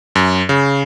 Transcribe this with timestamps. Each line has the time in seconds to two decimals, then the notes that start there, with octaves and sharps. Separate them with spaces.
0.15 F#2
0.49 C#3